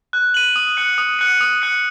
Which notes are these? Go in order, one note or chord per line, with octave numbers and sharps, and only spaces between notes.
F#6
D#7 F#7
D#6
F#6 C#7
D#6
F#6 C#7
D#6
F#6 C#7